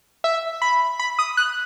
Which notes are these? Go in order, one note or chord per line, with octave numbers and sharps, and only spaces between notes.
E5
B5
B5
D#6
F#6